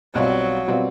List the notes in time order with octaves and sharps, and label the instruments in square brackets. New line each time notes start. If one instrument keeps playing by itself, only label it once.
[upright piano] B1 B2 G3 C4 F4 [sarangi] F#3
[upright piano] B2 G3 C4 F4